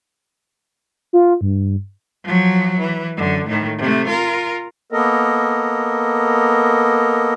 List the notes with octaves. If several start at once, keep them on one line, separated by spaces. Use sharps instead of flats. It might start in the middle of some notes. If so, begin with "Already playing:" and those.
F4
G2
F3 F#3
E3
F#2 D3
A2 D#3
C3 A3
F4 A#4
A#3 B3 A4 A#4 D#5